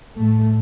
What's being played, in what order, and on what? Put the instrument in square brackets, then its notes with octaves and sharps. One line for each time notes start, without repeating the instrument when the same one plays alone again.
[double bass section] A2 A3